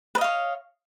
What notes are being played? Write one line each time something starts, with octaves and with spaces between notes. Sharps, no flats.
B4 C#5 D#5 F5